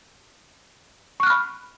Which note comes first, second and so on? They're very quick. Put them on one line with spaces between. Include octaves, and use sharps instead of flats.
C#6 F#6 F6 B5